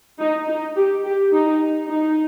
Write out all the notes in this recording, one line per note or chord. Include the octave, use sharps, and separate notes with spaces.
D#4
D#4
G4
G4
D#4
D#4